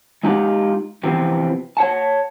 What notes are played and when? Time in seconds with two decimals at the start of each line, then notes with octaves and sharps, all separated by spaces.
0.23 G#3 D#4 F4 G4 F#5
1.03 C3 E3 F3 B3 C4
1.77 C#5 F#5 A5